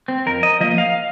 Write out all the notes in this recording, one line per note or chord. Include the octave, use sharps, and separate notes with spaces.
C4
F2 A#4
D#5
F3 A#3 D#5
F5